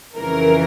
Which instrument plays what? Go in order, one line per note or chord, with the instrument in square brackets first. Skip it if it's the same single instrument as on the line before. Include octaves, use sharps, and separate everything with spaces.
[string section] F2 C#3 E3 A#4